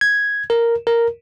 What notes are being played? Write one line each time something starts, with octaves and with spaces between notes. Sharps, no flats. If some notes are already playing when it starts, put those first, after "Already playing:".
G#6
A#4
A#4